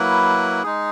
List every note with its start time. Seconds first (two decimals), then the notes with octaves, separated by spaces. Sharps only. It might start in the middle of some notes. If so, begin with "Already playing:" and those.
Already playing: F#3 A#3 E4 B4
0.63 G#3 D#4 G#4